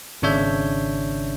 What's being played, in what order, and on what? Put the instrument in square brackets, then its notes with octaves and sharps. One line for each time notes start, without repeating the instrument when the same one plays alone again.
[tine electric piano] G#1 C#3 D4 C#5 E5 G6